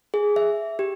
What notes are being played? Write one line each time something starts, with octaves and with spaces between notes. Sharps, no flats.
G#4
E5
G4